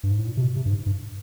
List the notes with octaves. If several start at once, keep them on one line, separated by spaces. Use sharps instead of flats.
G2
G#2
A2
A#2
C3
B2
C3
G2
G#2
G2